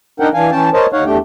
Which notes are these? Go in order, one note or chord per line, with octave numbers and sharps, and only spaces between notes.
D4 D#4 A#4 F#5 G5
E3 D4 F5 G#5
E3 C#4 G5 A5
A#4 C5 C#5 D#5 A5
D#2 D#4 C#5 F5 F#5
E2 A3 D4 G4 G5